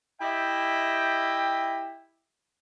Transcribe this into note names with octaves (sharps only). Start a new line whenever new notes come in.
E4 G4 D#5 E5 G5